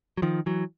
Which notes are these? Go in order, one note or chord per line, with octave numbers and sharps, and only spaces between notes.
F#3
D#3 F3
E3 F#3